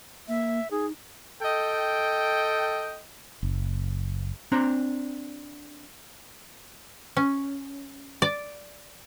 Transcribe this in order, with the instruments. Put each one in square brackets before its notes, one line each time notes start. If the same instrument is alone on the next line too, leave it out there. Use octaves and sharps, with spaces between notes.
[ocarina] A#3 [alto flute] E5
[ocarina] D#4 [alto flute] G#4
[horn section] A4 D#5 G5
[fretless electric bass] F#1
[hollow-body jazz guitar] C4 D4 A#5
[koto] C#4
D5